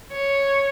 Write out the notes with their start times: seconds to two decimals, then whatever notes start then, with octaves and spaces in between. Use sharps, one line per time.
0.12 C#5